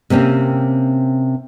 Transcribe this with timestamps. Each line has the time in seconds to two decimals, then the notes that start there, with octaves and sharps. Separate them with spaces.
0.10 C3 A#3 C4 C#4